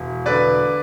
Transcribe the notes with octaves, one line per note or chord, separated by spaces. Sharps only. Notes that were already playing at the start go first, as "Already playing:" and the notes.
Already playing: E1
D3 B4 D5